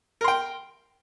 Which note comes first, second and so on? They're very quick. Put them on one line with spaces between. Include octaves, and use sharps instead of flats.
A#4 C6 G5